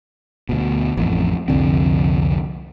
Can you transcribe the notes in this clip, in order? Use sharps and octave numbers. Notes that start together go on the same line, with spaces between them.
D2 B2
A1 F2
C2 F2 D3 C4